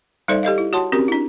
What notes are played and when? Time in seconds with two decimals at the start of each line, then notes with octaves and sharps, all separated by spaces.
0.28 G3 D#4 A4 C5 D5 E5
0.43 G4 A4 D#5 F5
0.58 E4
0.73 F#4 C#5 F#5 A5 C6
0.92 C4 C#4 F#4 G4 A#4
1.08 D4 E4